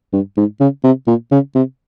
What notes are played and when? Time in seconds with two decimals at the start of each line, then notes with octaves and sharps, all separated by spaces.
0.13 G2
0.37 G#2
0.60 C#3
0.84 C3
1.07 A#2
1.31 C#3
1.55 C3